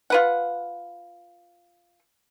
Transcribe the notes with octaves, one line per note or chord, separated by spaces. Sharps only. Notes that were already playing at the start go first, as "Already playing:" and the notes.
F4 B4 F#5